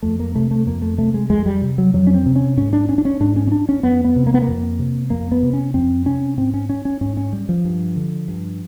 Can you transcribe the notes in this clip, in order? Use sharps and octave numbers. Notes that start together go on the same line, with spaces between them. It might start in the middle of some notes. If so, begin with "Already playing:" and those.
F2 A3
A#3
C3 A3
A3
F2 A#3
A3
C3 A3
G#3
F2 G#3
G3
C3
F#3
F2 F#3
C#4
C4
C3
C#4
G#2 C#4
D4
C#4
D4
C#4
G#2 D4
C#4
C#4
D4
C#4
F2 B3
B3
C3
A#3
B3
A#3
F2
C3
F2 A#3
B3
C3
C#4
F2 C4
C3 C#4
G#2 C4
C#4
C#4
C#4
G#2 C#4
C#4
G3
F3
G2
D3
G2